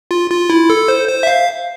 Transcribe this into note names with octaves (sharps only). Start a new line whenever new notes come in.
F4
F4
E4
A4
C5
C5
E5
F5